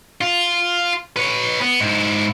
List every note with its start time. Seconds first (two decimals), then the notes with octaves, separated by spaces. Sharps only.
0.21 F4
1.16 B4 C#5
1.61 B3
1.80 G#2 E4